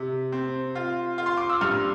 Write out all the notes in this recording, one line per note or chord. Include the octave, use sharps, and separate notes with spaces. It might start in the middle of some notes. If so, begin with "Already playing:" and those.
Already playing: C3
C4
F4
F4
C6
D6
E6
G2 F6